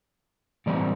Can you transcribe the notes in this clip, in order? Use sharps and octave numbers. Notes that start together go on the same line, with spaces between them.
A2 E3 G3 C4 D5